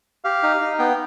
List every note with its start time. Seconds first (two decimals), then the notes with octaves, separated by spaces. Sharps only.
0.24 G4 F5
0.43 D#4
0.61 D#4
0.79 B3 G5